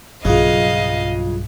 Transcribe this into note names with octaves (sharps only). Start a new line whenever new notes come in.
B1 G2 C#3 F#3 F4 D#5 F5